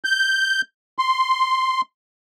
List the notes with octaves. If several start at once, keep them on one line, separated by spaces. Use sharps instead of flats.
G6
C6